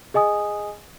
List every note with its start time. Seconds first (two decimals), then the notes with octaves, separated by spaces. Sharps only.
0.14 G#4 D#5 G#5 D#6